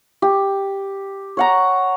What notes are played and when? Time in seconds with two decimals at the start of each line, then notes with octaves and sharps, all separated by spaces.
0.22 G4
1.37 C#5 F#5 A#5